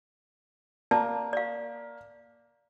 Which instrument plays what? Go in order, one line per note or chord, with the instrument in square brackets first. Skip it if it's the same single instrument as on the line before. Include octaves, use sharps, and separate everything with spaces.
[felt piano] A#3 [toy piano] D5 A5
[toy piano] D5 F5